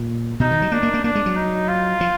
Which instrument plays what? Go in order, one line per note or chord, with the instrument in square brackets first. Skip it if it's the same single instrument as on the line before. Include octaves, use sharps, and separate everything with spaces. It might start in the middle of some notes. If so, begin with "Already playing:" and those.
Already playing: [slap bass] A#2
[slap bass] B2 [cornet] D#4
[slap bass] D#3
F#3
[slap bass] A#3 [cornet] D4
[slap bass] A#3
A#3
[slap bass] A#3 [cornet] D4
[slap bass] G#3
F#3
[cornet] D#4
F4
[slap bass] F3